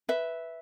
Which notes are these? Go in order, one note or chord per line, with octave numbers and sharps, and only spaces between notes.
B4 E5